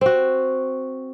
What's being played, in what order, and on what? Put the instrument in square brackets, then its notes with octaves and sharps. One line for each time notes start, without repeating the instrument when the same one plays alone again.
[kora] C4 F#4